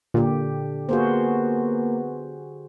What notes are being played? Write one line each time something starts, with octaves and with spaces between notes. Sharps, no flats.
A#2 D3 G4
A#3 B3 F#4 G#4 C5